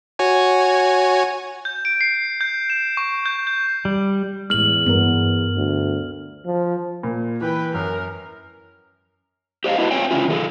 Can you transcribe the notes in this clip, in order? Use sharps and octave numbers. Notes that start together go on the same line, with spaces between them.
F#4 C#5 G#5
G6
D7
C7
G6
E7
C#6
G6
G6
G3
E2 A2 G#3 F6 F#7
G2 B3 A#4
D2
F3
A#2
E3 B4 G5
F#2 A#4
G4 C5 D5 D#5 F5
E4 F#4 B4 D#5 A5
C4 F4 C5 C#5 G5 G#5
C#3 C#4 E4 F4
D#3 G#4 A4